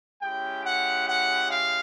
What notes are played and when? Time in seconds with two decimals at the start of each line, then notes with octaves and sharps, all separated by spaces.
0.22 G#3 C#4 E4 G4 G5
0.65 F#5
1.08 F#5
1.51 F5